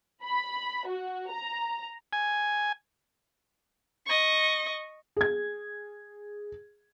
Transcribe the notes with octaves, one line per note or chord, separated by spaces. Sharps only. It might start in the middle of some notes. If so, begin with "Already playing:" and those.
B5
F#4
A#5
G#5
D#5 C#6
G#4 G#6